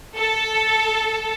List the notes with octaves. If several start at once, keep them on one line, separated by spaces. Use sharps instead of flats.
A4